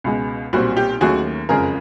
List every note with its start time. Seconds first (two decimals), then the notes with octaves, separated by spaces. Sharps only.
0.04 C#2 B2 G#3
0.53 B1 A#2 G3 C4 F#4
0.77 G4
1.01 D#2 D#3 F#3 A3 C#4 F#4 G#4
1.49 F#1 F2 C#3 F3 G#3 G#4 A#4